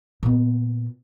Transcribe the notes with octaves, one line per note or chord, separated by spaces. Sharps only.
A#2 B3